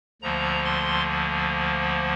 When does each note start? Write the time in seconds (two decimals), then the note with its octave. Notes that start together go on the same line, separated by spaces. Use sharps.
0.22 D2 D3 F3 A#3 A#5
0.65 C6